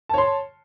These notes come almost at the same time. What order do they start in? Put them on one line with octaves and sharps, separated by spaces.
A5 C#5 C6